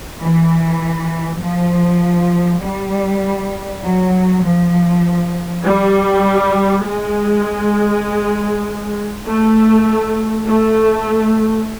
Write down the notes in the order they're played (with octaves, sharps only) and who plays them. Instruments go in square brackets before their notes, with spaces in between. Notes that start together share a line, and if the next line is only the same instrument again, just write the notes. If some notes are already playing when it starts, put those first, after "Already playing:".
[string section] E3
F3
G3
F#3
F3
G3
G#3
A3
A3